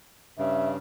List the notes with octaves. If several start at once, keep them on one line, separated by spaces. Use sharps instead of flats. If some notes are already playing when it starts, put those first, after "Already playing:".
G2 C#3 E5